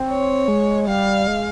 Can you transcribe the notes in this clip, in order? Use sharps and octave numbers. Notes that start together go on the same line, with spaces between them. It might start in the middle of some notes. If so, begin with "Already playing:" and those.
Already playing: C4
C#5
G#3
G3 F5
G#3